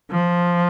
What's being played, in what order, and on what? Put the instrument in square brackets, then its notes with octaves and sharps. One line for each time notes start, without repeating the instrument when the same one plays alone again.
[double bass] F3